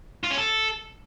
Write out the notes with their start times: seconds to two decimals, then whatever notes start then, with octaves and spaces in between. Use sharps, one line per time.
0.24 F4
0.31 C#4
0.38 A4